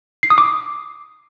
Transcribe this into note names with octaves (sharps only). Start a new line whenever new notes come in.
C7
D#6
D6